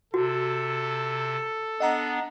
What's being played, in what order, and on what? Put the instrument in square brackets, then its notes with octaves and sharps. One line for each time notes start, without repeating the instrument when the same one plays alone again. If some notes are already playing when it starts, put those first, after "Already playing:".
[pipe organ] C3 [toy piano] F#4 [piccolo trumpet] A4
[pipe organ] B3 D4 [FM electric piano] D#5 F#5 A#5